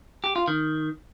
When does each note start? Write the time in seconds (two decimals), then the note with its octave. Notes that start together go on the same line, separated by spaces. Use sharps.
0.24 G4
0.36 F4
0.48 D#3